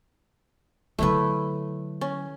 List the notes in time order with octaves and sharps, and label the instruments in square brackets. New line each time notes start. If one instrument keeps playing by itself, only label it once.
[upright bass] D3 F#3 [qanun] A3 E4 B4
[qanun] C#4